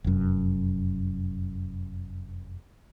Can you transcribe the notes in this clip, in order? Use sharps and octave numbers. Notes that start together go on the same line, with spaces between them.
F1 F#2